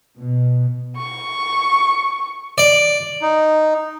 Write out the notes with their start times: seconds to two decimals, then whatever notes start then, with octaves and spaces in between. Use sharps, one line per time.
0.17 B2
0.97 C#6
2.58 D5
3.22 D#4